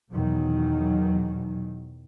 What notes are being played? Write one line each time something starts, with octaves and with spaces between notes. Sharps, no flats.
E2 B2 D#3 F#3